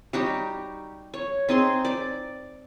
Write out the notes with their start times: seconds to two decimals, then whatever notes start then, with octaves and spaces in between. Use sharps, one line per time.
0.13 G3 D#4 F#4 G4
1.14 C#5
1.49 C4 D#4 G#4 C6
1.85 D5 D6